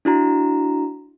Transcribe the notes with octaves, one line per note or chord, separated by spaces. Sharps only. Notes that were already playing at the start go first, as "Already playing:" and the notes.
D4 E4 F#4 A#5